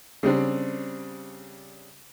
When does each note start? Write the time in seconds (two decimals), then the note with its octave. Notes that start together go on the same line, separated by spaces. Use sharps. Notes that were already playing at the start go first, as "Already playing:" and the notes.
0.23 C#3 G3 C4 D4